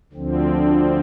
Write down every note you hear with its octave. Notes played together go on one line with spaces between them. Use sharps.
D2 D3 F3 C4